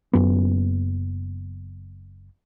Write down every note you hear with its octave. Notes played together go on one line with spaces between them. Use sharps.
F#1 F#2 B3